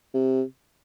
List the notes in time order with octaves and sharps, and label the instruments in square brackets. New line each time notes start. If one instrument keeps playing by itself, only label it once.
[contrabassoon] C3